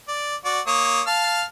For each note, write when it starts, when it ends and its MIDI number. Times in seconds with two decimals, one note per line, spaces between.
0.08 0.35 74
0.45 0.60 66
0.45 0.60 74
0.67 1.02 58
0.67 1.02 73
0.67 1.02 87
1.07 1.43 77
1.07 1.43 81
1.07 1.43 89